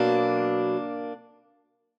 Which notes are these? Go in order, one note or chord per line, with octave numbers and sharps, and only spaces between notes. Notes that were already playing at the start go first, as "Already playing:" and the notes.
Already playing: B2 F#3 A#3 D4